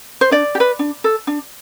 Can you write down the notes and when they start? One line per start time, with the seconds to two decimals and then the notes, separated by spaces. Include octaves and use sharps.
0.21 C5
0.31 D4 D5
0.55 G4
0.60 B4
0.79 D4
1.04 A4
1.27 D4